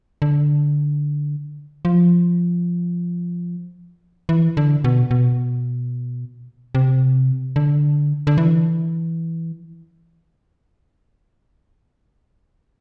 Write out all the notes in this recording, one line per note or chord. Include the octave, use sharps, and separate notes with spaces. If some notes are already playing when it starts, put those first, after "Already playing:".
D3
F3
E3
D3
B2
B2
C3
D3
D3
E3